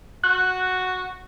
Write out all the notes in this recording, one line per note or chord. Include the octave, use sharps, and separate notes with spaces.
F#4 F#6